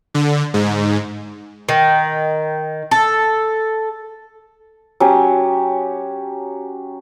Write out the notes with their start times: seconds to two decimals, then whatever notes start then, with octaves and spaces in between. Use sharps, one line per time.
0.14 D3
0.54 G#2
1.69 D#3
2.91 A4
5.00 F#3 C#4 G4